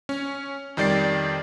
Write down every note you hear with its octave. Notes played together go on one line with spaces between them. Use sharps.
C#4
F2 D#3 G3 D5 A6 C7